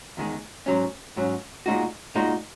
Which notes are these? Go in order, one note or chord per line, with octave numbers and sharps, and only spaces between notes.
E2 D#3 G#3
G#2 F#3 C#4
G#2 F#3 C#4
A#2 G#3 D#4 F#4
A#2 G#3 D#4 F#4